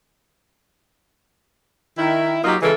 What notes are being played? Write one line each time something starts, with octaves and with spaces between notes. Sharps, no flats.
D#3 E4
F#3 A#3 D#4 F4 G4
C#3 E3 G#3 A4 A#4